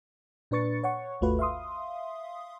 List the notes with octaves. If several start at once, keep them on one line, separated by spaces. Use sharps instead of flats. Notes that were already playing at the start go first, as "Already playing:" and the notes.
A#2 D4 B4 C#6 A6 C#7
C#5 F#5 C#6
G#1 D#2 A3 F4 F#4 B4
E5 F5 C6 D#6